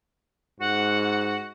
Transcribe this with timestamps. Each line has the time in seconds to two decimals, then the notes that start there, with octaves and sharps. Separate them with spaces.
0.60 G#2 F#4 F#5